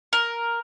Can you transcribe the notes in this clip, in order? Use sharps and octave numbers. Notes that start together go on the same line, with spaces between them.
A#4